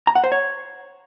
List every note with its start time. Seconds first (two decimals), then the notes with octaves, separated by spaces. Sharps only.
0.07 A#5
0.15 F#5
0.24 C5
0.32 C#5